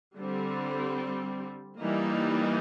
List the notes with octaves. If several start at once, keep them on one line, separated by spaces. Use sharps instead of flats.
D3 G3 C4
E3 G3 A#3 D#4